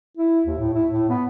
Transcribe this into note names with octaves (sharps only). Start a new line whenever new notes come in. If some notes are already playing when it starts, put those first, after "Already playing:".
E4
D#2
A2
E4
A2
B3